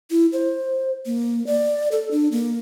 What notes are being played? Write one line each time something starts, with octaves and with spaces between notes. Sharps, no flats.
E4
C5
A#3
D5
A4
D4
A#3